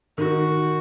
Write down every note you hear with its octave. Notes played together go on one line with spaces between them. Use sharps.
D#3 F#4